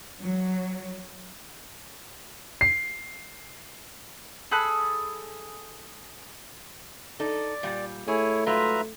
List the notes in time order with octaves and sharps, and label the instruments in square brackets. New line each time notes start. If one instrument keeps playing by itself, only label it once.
[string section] F#3
[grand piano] C7
[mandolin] G#4 A4 B5 F#6
[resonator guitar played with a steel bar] D#4 A4 [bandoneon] D5
[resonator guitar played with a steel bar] A#2 G3
[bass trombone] A3 [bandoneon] E4 C#5 [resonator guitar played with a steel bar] G#4
[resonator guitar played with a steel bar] G#2 F#3 F4 [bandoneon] B4 E5 A#5